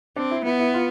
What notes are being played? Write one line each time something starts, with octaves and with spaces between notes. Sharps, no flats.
C4 D4
E4
B3 E4
E4
F4